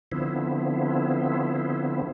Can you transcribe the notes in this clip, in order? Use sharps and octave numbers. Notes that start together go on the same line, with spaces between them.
D3 F3 B3 C4 E4